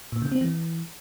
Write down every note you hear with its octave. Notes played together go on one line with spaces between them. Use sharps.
A#2
C#3
C4
E3